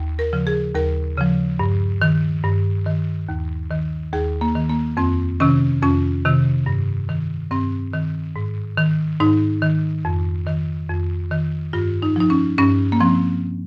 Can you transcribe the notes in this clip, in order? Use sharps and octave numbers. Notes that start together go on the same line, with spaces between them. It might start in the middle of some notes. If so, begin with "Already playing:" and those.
Already playing: D#2
A#4
C#3 F3
G#4
D#2 A#4
C#3 F3
G2
D#3
G2
D#3
D#2
D#3
D#2 G#4
A#3
D#3
A#3
F2 C4
C3 D#3 C#4
F2 C#4
C3 D#3
G2
D#3
G2 C4
D#3
G#2
D#3
G#2 D#4
D#3
F2
D#3
F2
D#3
G2 F4
D#4
F3 D#4
C#4
G2 C#4
A#3
F3 C4